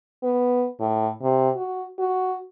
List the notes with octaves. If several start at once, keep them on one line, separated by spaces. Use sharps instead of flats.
B3
A2
C3
F#4
F#4